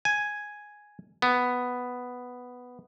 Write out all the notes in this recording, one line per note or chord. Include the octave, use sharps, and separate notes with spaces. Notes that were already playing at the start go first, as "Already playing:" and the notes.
G#5
B3